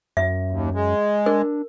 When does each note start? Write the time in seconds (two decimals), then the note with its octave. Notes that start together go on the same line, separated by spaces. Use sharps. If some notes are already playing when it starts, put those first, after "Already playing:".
0.17 F#2 E5
0.51 D#2
0.74 G#3
1.26 D4 A#4